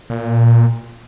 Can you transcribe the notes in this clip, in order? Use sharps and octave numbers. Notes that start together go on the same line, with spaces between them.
A#2